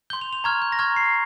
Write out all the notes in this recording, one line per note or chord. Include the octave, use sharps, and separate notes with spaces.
C6 G6 G7
F7
F7
A#5 C#6 F6 G#6
G6
A#6
A#5 C#6 F6 G#6
C7